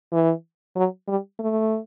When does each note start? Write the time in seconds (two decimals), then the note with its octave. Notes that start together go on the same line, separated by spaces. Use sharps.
0.12 E3
0.76 F#3
1.08 G3
1.40 A3